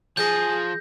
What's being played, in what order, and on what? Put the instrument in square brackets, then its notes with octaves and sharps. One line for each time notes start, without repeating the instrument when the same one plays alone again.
[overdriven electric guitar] F3 [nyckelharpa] G#4 [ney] G#5 [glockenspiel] G6 A#6